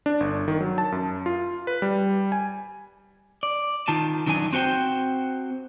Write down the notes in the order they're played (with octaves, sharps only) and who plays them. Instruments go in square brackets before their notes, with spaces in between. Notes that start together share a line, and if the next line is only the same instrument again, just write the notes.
[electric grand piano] D4
G1
D#3
F#3
A5
F#2
F4
B4
G3
G#5
[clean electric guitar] D5
D#3 F4 A5
F#2 D#3 E3 D4 G#5
C4 F#4 C5 G5